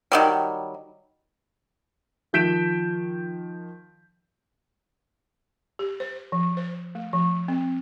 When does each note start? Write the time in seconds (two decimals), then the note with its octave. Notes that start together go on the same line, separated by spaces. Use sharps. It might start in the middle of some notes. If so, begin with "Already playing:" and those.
0.12 D#3 F#3 G3
2.33 D#3 F3 G6 B6 D7 E7
5.79 G4
6.00 C5
6.32 F3
6.57 C5
6.95 A3
7.13 F3
7.48 C4